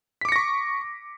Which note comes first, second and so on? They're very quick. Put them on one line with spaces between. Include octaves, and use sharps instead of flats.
B6 D6 C#7 A#6 C#6